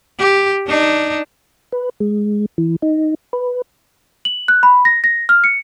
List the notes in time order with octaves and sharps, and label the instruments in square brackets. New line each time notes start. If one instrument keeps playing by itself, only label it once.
[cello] G4
D4 D#4
[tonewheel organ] B4
G#3
E3
D#4
B4
[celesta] F#7
F#6
B5
A#6
A#6
F6
C#7